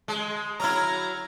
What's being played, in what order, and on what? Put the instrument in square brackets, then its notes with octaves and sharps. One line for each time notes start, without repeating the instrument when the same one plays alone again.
[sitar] G#3
[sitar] F#3 E4 [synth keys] A#5 F6 G#6